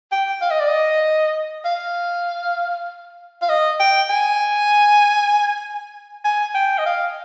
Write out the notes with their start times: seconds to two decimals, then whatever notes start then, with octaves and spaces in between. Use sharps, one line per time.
0.12 G5
0.42 F5
0.51 D#5
0.60 D5
0.68 D#5
1.65 F5
3.42 F5
3.49 D#5
3.80 G5
4.10 G#5
6.25 G#5
6.55 G5
6.78 D#5
6.86 F5